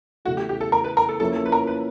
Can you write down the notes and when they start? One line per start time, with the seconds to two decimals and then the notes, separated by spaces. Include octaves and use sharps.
0.25 C#3 E3 A3 F#4
0.37 G4
0.49 G4
0.61 A4
0.72 A#4
0.84 B4
0.97 A#4
1.09 A4
1.20 F3 A#3 C#4 E4 A4
1.36 A4
1.46 B4
1.52 A#4
1.67 B4